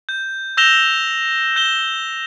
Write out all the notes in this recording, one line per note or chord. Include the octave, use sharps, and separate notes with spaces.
G6
E6 G6 A#6 E7 F7 G7
G6 E7 G7